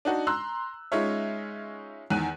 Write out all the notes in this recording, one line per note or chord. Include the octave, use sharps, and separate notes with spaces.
D4 D#4 F#4
A#5 C6 E6 F#6
G#3 C#4 D#4 F4 C#5 E5
E2 D#3 F#6 D#7